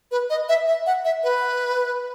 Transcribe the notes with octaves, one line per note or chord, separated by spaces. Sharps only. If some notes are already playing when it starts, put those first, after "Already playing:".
B4
D#5
E5
E5
F#5
E5
B4